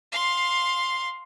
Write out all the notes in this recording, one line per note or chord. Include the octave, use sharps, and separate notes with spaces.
F5 C6